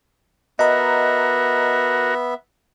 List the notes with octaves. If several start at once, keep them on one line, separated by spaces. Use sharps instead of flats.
B3 F#4 A#4 D#5 E5 A#5